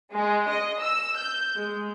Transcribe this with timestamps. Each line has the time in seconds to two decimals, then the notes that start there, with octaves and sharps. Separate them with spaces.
0.14 G#3
0.49 D#5
0.80 E6
1.17 G6
1.56 G#3